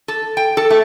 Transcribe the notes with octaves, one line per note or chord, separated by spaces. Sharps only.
A4
G5
A4
A3